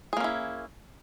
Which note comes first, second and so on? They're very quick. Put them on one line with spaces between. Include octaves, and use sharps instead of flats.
G#4 A#3 C#4 E4